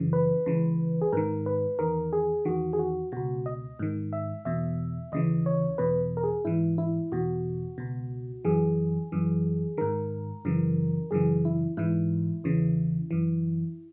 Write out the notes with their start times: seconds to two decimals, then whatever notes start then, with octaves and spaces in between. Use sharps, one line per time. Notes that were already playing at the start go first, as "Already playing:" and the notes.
Already playing: F#2 C#3 E3
0.13 B4
0.46 C#2 C#3 E3
1.01 G#4
1.12 G#2 D#3 A#4
1.46 B4
1.79 E2 D#3 A#4
2.13 G#4
2.45 E2 D#3 F#4
2.73 G#4
2.79 F#4
3.12 C#2 B2 F#4
3.46 D#5
3.79 G#2 D#3
4.13 E5
4.45 E2 B2 E5
5.12 D#2 C#3 E3 D#5
5.46 C#5
5.78 E2 B2 B4
6.17 A#4
6.24 G#4
6.45 G#2 E3 E4
6.78 E4
7.12 E2 B2 F#4
7.78 C#2 B2
8.45 F#2 E3 G#4
9.12 F#2 E3
9.78 G#2 D#3 A#4
10.45 F#2 C#3 E3
11.11 F#2 C#3 E3 G#4
11.45 E4
11.77 G#2 E3 E4
12.44 E2 C#3 E3
13.11 F#2 E3